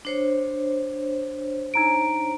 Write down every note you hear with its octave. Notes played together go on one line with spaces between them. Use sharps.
D4 C5 C#5
D#4 A#5 D7